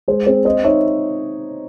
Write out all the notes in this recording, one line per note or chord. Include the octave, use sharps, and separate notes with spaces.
G#3 G#4 C5
C4 G#4 C5
C4 C5 D#5
D#4 C#5 E5